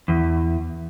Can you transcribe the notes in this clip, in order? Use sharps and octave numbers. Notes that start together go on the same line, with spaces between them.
E2